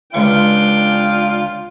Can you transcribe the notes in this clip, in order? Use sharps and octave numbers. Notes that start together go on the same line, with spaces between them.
C#2 D4 F4 G5 C#6